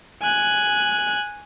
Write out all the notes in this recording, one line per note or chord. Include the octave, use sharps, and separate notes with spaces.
G#5 F#6